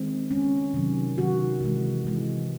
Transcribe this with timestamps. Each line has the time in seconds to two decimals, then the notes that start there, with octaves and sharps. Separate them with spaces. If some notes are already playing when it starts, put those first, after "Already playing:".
Already playing: D#3 G#3 C4
0.31 D#3 G#3 C#4
0.74 C3 D#3 F#3
1.18 C3 D#3 F#3 F#4
1.61 C3 E3 G#3
2.05 C3 E3 G#3